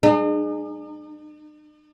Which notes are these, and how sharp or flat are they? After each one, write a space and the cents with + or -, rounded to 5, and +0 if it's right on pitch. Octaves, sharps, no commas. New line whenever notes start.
D#4 -45 G#4 +0